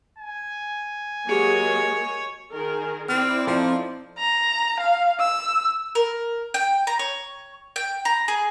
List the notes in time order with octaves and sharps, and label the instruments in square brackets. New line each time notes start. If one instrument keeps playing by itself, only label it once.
[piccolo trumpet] G#5
[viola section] F#3 G#3 A#3 [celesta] G4 G#4 C#7 [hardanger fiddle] C#5
[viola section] D#3 G#4 A#4
[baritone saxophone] C4 [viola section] E4 C5 D5 [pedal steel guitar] F6
[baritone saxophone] F3 [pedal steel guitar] C4 D#4 A4
[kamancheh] A#5
F5
E6
[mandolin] A#4
G5
A#5
C#5
G5
A#5
G#4